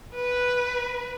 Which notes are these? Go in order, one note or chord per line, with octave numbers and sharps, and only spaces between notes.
B4